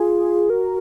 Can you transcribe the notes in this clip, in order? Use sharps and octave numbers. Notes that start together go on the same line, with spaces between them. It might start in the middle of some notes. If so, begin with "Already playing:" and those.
Already playing: F4 G#4
F#4 A#4